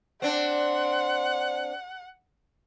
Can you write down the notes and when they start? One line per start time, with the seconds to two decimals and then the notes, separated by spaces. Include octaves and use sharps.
0.22 C4 D4 F#5